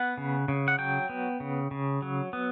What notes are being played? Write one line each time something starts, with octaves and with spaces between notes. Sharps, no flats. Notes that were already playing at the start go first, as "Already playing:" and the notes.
Already playing: B3 F#5
C#3
C#3
F#5
F#3 G5
B3
C#3
C#3
F#3
B3